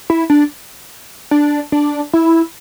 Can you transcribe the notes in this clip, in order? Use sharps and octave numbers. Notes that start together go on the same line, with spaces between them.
E4
D4
D4
D4
E4